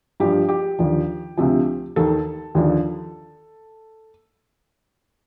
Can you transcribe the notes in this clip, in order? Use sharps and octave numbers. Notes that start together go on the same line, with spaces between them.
G2 F3 G4
G4
D#2 D3 F3
D2 C3 F3
D#2 D#3 A4
D#2 D3 F3